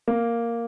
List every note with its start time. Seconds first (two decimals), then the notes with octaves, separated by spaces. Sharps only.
0.08 A#3